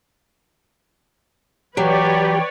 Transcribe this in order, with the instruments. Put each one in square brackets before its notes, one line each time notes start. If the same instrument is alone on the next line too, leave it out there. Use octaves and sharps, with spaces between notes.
[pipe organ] E3 G5 [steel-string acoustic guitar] F#3 [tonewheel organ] G4 [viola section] B4 C#5 D5